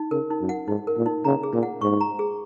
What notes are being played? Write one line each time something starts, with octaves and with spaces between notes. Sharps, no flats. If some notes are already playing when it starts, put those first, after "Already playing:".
Already playing: D#4
C#3 A#4
D#4
F#2
F#5
G#2 D#4
A#4
A#2
D#4
C#3 A#5
G#4
A#2
F#5
G#2 C#6
A#5
G#4